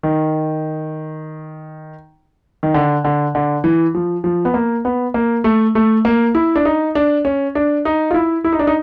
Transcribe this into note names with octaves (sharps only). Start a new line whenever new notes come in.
D#3
D#3
D3
D3
D3
E3
F3
F3
B3
A#3
B3
A#3
A3
A3
A#3
E4
D4
D#4
D4
C#4
D4
D#4
F4
E4
E4
D#4
D4
D#4